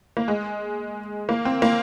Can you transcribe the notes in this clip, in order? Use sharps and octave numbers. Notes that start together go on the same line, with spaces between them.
A#3
G#3
A#3
C4
A#3